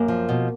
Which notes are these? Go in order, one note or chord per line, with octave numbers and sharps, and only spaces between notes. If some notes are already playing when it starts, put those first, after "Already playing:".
Already playing: F#2 A#3
F3
B2